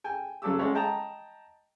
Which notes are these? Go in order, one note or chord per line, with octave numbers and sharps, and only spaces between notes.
G5 G#5
C#3 F#3 A4 D6 E6
G#3 A3 C#4 C#5 F#5
D#5 G5 A5 A#5